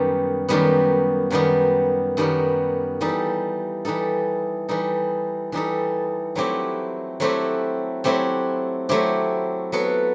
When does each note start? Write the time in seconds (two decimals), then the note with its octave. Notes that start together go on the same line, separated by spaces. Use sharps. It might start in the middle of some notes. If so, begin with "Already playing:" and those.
Already playing: F#2 D#3 G3 B3
0.49 F#2 D#3 G3 B3
1.30 F#2 D#3 G3 B3
2.17 F#2 D#3 G3 B3
3.01 E3 G3 D#4 A4
3.85 E3 G3 D#4 A4
4.69 E3 G3 D#4 A4
5.52 E3 G3 D#4 A4
6.35 F#3 A3 C4 E4 G4
7.20 F#3 A3 C4 E4 G4
8.04 F#3 A3 C4 E4 G4
8.89 F#3 A3 C4 E4 G4
9.72 F#3 B3 F#4 A4